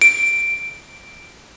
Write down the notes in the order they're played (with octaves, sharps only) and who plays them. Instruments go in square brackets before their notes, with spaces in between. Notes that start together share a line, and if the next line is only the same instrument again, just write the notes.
[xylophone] D7